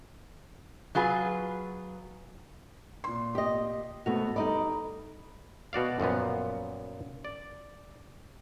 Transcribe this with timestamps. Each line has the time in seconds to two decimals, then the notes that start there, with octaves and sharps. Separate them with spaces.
0.95 F#3 F4 G#4 B4
3.04 A#2 C6
3.35 G4 D#5
4.06 G#1 A3 B3 F#4 F7
4.36 G3 D#4 A4 D5 D#5 A#5 B5
5.73 B2 F#4 D5 F5
6.00 F#2 A#2 F3 B3
7.25 D5